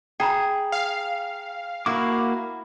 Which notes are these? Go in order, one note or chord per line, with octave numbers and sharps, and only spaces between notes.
G#4 G5 A#5 B5
F5
A#3 E4 F#4 D6